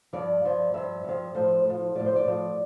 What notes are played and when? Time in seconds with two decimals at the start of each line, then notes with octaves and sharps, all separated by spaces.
0.13 G2 F3 D5
0.44 G2 F3
0.74 G2 F3 E5
1.04 G2 F3
1.35 A2 F3 C5
1.65 A2 F3
1.95 A2 F3 D5
2.06 C5
2.16 D5
2.26 A2 F3